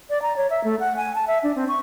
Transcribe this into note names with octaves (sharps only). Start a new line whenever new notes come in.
D5
A#5
C#5
E5
A3
F#5
G#5
A5
E5
D4
C4
C#6